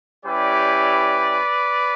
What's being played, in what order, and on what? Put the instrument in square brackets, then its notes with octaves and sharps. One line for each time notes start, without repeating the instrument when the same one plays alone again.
[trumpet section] G3 C#4 E4 G4 B4 D5